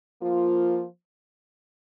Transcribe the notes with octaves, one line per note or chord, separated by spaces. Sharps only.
F3 A#3 F4